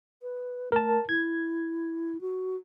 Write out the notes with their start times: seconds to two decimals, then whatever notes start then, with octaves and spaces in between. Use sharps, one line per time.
0.22 B4
0.72 A3 A#4 A5
1.09 E4 G#6
2.21 F#4